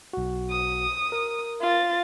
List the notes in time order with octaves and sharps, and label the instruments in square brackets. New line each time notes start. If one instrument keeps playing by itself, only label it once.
[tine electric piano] B1 F#4
[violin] D#6
[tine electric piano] A#4
[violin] F4 A6